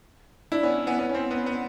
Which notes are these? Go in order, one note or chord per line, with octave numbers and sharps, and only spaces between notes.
D4 E4
B3 C#4
B3 C#4
B3 C#4
C#4
C4
B3
B3